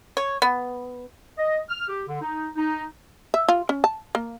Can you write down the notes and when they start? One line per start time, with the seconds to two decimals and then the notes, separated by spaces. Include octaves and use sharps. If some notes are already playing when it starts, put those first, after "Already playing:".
0.17 C#5
0.42 B3
1.37 D#5
1.69 F6
1.88 G4
2.07 D3
2.21 D#4
2.56 D#4
3.34 E5
3.48 F4
3.69 C#4
3.84 A5
4.15 A#3